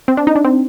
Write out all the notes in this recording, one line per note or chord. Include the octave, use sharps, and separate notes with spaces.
C4
D4
D#4
D4
C4